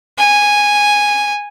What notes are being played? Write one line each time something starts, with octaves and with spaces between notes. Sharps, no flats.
G#5